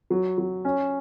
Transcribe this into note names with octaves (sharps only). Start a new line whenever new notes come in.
F#3
F#3
C#4